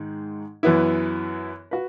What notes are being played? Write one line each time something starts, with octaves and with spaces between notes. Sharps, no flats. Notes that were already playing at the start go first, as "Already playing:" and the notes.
Already playing: G#2 D#3 G#3 D#4
F#2 E3 B3 E4
F#4 B4